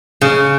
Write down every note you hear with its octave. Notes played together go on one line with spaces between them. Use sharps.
C#3